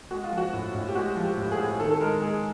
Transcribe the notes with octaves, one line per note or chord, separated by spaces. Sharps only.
G#3 F#4
F4
F3
F#4
A2
A2
G4
G#3 F#4
F3
G4
A2
G#4
A2
D#3 A4
A4
G#3 A#4
G#3 G#4